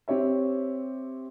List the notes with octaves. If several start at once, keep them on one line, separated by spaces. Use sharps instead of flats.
C4 G4 C#5 E5